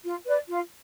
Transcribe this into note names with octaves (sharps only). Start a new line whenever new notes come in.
F4
B4 D5
F4